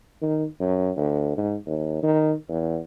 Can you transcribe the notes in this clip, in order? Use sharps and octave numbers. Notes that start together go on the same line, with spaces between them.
D#3
F#2
D2
G#2
D#2
D#3
E2